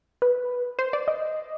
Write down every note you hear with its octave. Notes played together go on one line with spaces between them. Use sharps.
B4
C5
D5
D#5